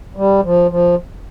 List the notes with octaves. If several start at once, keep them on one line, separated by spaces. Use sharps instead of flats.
G3
F3
F3